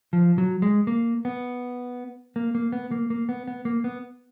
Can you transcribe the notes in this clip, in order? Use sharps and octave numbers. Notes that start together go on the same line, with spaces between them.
F3
F#3
G#3
A#3
B3
A#3
A#3
B3
A#3
A#3
B3
B3
A#3
B3